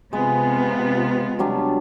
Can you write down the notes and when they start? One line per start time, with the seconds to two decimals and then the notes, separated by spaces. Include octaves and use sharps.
0.13 C3 G#3 B3 F4
1.39 F#3 G3 D4